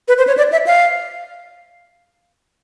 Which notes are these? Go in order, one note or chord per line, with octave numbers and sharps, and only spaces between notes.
B4
C5
C#5
D5
E5
F5